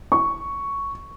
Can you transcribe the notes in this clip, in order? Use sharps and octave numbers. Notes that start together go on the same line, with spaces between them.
C#6